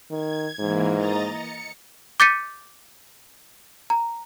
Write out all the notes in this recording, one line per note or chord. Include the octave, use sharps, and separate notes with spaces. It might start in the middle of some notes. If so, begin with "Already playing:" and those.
D#3 G#6
G#2 E3 A#3
D#5 A#5 A6
C#7
D6 G6 A6 B6 C#7 D#7
A#5